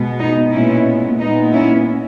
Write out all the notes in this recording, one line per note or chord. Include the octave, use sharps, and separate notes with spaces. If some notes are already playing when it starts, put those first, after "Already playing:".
Already playing: B2 G#3 B3
D#4
A#2 G#3 B3 C#4 E4
A#2 G#3 B3 D#4
C#4 E4